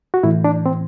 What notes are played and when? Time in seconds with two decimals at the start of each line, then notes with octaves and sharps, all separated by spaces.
0.14 F#4
0.23 A2 E3 E4
0.44 D4
0.66 C4